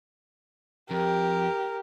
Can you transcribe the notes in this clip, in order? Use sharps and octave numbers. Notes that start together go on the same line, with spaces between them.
F2 G4 A#4